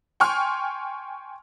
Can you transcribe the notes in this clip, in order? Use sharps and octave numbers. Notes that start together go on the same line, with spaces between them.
G5 G#5 C6 C#6 F6